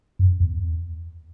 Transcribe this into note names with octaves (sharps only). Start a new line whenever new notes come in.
F#2
E2